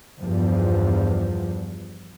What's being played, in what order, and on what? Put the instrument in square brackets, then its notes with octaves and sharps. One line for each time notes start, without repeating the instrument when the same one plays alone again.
[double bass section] E2 G2 F3